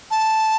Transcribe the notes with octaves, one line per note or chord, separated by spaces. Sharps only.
A5